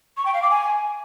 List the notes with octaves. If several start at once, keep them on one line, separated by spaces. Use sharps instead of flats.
C#6
G5
F5
D6
G#5